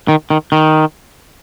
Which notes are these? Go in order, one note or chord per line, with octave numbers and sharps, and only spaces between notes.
D#3
D#3
D#3